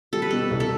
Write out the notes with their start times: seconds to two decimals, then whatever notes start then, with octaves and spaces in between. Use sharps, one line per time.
0.13 G3 A4
0.22 B4
0.31 B2 A4
0.51 C2
0.60 A4